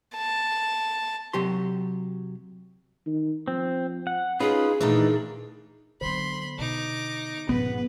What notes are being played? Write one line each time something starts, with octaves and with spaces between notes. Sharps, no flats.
A5
C3 F#3 G4 C6
D#3
F3 C4
F#5
C#4 D#4 F4 G#4 B4
A#2 D#3 E3 A3 D4 D#4
D3 F#3 B3 C5 B5 C6
B2 D#4 D6
G2 A#2 C#3 F3 B3 B4